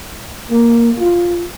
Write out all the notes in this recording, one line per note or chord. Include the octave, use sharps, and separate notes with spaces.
A#3
F4